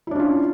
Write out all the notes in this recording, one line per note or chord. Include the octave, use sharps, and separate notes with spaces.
C#4 D4 E4 F4